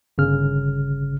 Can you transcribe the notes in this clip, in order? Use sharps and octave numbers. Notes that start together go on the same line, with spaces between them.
G1 C#3 F6